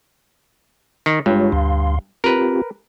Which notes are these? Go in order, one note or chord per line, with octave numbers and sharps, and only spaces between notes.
D#3
G2 G#3 F4 C#5
D2 F5 C6
C4 F4 G4 A#4 B4